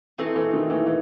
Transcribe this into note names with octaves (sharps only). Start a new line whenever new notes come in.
E3 A3 C4 D#4
E3
D#3
E3
E3